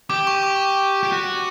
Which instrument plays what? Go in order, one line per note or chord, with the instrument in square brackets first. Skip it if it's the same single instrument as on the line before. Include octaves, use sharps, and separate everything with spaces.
[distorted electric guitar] G4 [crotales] D6
[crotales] C#6
D6
[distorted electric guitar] G4
F#4